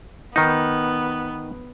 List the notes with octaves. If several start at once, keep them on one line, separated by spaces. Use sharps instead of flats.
D#3 B3 D#4